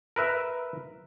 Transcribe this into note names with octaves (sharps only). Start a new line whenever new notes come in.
A#4 B4 E5